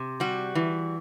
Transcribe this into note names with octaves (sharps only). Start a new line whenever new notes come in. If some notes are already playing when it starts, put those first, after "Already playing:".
Already playing: C3
G3 F#4
E3